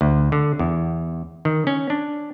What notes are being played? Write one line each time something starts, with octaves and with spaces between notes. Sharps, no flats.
D2
D3
E2
D#3
C#4
D4